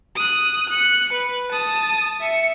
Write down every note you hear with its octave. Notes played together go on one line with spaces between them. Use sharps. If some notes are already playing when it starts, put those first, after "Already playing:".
D#6 F#6
F#6 C#7
B4
A5 D#6
E5 C#7